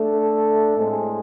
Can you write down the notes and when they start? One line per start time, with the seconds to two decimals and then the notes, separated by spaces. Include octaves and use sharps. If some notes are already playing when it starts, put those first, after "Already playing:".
Already playing: A3 D4 A4
0.77 A2 G#3 C4 G#4 C5